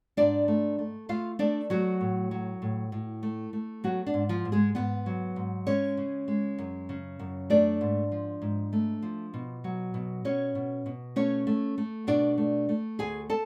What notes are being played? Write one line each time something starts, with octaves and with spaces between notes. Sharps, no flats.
G#2 D4 D5
A3
A3
A3 F4 F5
A3 D4 D5
F#3 A3 F#4
A2
F#3
A2
A2
A3
A3
F#3 B3 F#4
D4
G#2
F3 F4
G#2
G#3 G#4
G#2 B3 B4
F#3
G#2
G#3 C#4 C#5
C#3
G#3
F#2
C#3
F#2
A3 D4 D5
G#2
F3
G#2
A3
F3
B2
F#3
B2
B2 C#4 C#5
B2
B2
A3 C#4 C#5
A3
A3
B2 D4 D5
A3
A3
D2 G#4 G#5
A4 A5